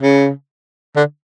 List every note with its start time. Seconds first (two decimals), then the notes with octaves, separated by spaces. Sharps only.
0.01 C#3
0.96 D3